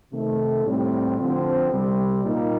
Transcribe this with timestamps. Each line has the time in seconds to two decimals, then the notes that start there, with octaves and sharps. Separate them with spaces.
0.13 C3 D#3 A3
0.65 A2 G3 C4
1.18 D3 F3 C4
1.71 C2 C3 G3
2.24 A#2 G3 A#3 D#4